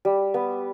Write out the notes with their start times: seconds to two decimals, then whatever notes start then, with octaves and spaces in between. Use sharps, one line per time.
0.05 G3
0.34 B3